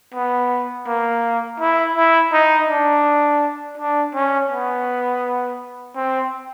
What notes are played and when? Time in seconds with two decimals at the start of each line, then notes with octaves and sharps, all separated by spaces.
0.14 B3
0.88 A#3
1.60 E4
1.96 E4
2.33 D#4
2.70 D4
3.78 D4
4.14 C#4
4.51 B3
5.96 C4